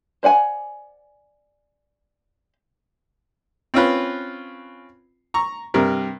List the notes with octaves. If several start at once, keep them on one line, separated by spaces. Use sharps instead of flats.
C5 D5 F#5 G#5
C4 C#4 F4 B4
A#5 C#6
G2 C3 A#4